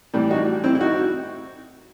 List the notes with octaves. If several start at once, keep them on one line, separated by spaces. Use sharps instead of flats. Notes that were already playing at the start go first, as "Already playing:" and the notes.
A2 E3 G3
D#4 F#4
C4 E4
E4
D#4 F#4